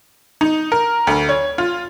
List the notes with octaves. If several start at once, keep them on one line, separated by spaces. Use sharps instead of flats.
D#4
A#4
D2
C#5
F4